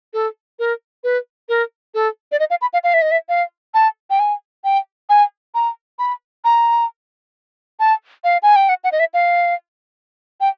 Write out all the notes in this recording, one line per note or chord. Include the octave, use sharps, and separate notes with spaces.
A4
A#4
B4
A#4
A4
D5
D#5
F5
B5
F5
F5
E5
D#5
E5
F5
A5
G5
G#5
G5
G#5
A#5
B5
A#5
A5
F5
G#5
G5
F#5
F#5
D#5
E5
F5
G5